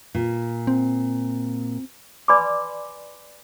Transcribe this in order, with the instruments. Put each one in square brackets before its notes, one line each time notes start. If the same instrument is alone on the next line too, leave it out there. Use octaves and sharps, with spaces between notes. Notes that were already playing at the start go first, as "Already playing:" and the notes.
[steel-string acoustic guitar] A#2
[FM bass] C4
[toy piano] B4 D5 G#5 B5 C6 D6